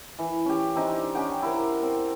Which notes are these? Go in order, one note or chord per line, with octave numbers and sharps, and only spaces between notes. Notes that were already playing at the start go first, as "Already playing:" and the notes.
E3
C#4 G4
C4 D4 D#4 D5
C#4 G4 F#5 G5
E4 A#4 C5
C4